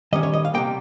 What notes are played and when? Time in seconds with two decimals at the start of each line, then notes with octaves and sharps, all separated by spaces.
0.13 D#3 G3 C#4 D#5
0.23 C#5
0.33 D#5
0.45 F5
0.54 C3 G3 A#3 G5